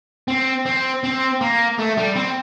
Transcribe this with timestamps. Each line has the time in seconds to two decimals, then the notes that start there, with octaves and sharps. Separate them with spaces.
0.28 C4
0.66 C4
1.04 C4
1.41 A#3
1.78 A3
1.97 G3
2.16 C4